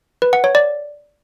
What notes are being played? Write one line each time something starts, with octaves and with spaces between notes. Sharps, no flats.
B4
F#5
C#5
D5